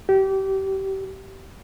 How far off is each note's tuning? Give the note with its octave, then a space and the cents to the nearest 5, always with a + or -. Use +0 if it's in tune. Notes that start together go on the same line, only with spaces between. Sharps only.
G4 -25